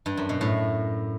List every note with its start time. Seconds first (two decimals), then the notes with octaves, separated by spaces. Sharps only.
0.06 G2
0.17 F#2
0.29 B2
0.41 A2